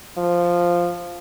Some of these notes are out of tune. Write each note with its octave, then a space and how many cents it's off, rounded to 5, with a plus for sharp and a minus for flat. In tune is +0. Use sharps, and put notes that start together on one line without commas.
F3 -5